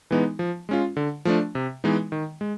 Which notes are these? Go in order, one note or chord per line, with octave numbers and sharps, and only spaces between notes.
E3 G#3 B3 D#4
F3
G#3 C#4 F4
D3
F3 A3 D4
C3
E3 G#3 B3 D#4
D#3
G#3